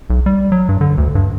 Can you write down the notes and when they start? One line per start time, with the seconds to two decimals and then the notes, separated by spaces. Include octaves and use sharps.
0.10 B1
0.26 G3
0.52 F#3
0.69 G2
0.81 D3
0.98 D2
1.15 G2